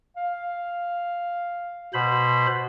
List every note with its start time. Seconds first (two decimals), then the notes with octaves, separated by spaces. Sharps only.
0.16 F5
1.94 B2 C5 B5